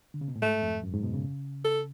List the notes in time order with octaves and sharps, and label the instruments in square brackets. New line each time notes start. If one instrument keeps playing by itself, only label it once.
[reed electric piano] D3
C#3
B2
A2
[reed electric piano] G#2 [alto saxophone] A3
[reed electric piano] F2
F#2
G#2
B2
C#3
[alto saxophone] A4